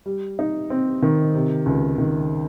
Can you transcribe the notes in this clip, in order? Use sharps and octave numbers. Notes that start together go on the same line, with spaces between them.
G3
D#4
C4
D#3
C3
C#2
D#3